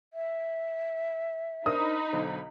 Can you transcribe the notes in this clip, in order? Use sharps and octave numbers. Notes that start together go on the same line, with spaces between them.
E5
D4 D#4 A#4 C5 B5 D#6
B1 D3 C5